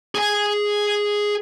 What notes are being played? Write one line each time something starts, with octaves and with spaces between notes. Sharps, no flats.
G#4 G#5